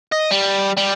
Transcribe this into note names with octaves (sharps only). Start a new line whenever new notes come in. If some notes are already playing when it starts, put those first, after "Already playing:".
D#5
G3
G3